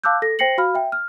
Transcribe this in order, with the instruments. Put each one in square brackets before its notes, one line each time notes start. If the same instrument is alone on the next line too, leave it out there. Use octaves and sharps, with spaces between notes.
[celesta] F5 A5 D6 E6 F#6 G6
A4 A#6
C5 G5 A#6 C7 C#7 F#7
F#4 F5 B5 F6
E5 G5
F6